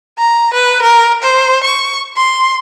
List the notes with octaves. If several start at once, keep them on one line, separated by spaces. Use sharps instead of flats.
A#5
B4
A#4
C5
C#6
C6